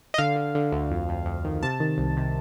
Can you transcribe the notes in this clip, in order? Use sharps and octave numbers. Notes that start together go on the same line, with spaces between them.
D#5
D3 F5
D3
D3
D2
F2
F2
F2
D#3
C3 A5
D#3
C2
C3